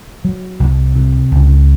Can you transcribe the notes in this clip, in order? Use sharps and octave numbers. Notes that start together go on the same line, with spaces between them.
F#3
C2
C3
C#2